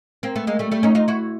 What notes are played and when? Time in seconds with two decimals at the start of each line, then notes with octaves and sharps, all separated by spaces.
0.23 A#3 C4
0.36 A3 B3
0.47 G#3 A#3
0.59 G3 A3
0.71 G3 A3
0.83 C#4 D#4
0.95 D#4 F4
1.08 E4 F#4